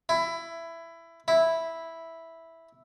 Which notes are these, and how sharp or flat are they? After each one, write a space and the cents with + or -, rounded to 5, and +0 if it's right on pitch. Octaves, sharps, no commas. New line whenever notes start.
E4 +15
E4 -5